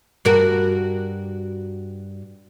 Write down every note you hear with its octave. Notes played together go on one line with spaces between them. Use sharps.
G2 F#4 A#4